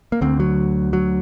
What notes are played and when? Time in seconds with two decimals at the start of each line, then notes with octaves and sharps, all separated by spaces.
0.12 A#3
0.21 D2 D3 C4
0.40 F#3
0.93 F#3